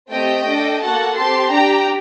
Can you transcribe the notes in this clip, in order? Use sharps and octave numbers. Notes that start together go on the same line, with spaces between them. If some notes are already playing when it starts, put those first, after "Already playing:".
A3 C4 G4 D#5 G5
D4 A4
A#3 F#4 A4 F#5 A5
C4 G4 A5 C6
D4 G4 G5 A#5